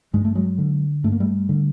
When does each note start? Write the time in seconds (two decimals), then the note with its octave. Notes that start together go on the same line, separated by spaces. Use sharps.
0.13 G2 G#3
0.25 A3
0.35 F#3 G#3
0.58 D3
1.04 G2 A3
1.12 A#3
1.20 G3 A3
1.49 D3